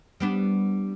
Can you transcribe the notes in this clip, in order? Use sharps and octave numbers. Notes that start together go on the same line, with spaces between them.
G3 B3 D4